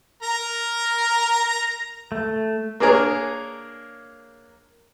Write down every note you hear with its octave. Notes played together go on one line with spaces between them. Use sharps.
A#4 A#5
A3
A#3 D4 G#4 A#4 C#5